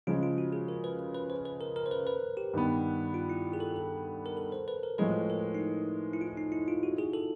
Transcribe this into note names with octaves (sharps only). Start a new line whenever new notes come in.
C#3 F3 G#3 F4
F4
F#4
G#4
A#4
B4
B4
B4
C5
B4
A#4
A#4
C5
B4
B4
G4
G2 D#3 G3 B3
F4
E4
G#4
A4
A4
A#4
A4
C5
B4
A#4
A2 F3 G#3 B4
A#4
D#4
E4
E4
F4
D#4
E4
F4
F#4
G#4
A4